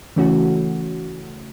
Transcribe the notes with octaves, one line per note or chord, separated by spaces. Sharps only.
C#3 E3 A3 C#4 F#4